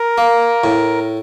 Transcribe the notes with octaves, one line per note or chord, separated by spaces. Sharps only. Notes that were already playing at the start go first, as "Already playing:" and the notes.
Already playing: A#4
A#3
A2